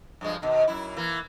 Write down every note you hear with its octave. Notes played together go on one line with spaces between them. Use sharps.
G2 F3 G#3
B2 D#3
F#2 E4
E3 A#3